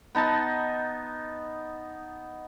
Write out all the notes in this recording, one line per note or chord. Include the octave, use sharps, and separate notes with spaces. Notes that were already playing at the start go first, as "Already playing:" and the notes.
B3 D#4 A5